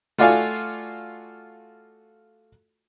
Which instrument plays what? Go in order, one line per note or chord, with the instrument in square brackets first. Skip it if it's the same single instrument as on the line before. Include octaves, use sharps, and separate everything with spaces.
[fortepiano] A3 F4 F#4 D5 F5 G#5